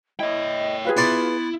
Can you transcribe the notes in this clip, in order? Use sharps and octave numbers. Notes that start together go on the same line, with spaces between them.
E4 C#5 D#5 G5
F4 G#4 B4 F5
B3 E4 D5 C6